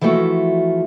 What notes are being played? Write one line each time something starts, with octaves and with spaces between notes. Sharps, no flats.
E3 F3 G#3 A3 F#4